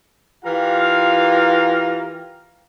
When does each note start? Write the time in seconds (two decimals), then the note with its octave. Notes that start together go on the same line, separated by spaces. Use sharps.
0.45 E3 F4 G4 A#4 F5